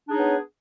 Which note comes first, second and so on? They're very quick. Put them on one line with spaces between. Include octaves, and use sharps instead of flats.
D4 G#4 D#4 C#5 B3